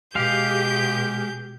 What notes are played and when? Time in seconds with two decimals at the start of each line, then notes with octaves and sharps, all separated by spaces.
0.15 B2 G#3 G4 G#4 F5 G6